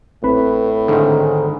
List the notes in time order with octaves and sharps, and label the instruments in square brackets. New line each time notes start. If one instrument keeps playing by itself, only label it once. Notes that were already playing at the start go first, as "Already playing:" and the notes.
[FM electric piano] A1 C4 B5 [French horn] A2 [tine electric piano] B4
[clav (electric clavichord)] G#2 D#3 [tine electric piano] D3